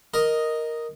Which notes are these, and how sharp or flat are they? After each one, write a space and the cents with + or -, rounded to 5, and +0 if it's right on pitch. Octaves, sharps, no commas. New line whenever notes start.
A#4 +0 D#5 +0